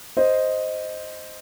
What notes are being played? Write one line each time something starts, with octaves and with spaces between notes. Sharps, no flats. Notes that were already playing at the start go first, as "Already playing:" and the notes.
C5 D#5